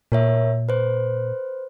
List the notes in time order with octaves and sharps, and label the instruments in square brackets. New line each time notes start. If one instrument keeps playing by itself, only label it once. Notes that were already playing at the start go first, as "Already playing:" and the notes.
[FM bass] A#2 [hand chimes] A#4 C#5 E5
[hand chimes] B4 C5